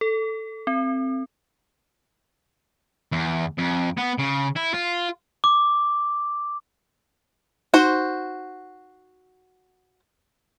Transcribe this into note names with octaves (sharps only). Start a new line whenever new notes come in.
A4
C4
E2
F2
B3
C#3
E4
F4
D6
D#4 F#4 C5